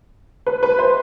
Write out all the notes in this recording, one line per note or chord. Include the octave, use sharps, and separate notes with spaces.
B4
B4
C5